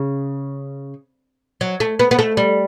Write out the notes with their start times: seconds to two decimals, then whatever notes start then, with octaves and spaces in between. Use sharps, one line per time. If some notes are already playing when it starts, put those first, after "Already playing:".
Already playing: C#3
1.61 F#3
1.80 A3
1.99 B3
2.11 B3
2.19 A3
2.37 G3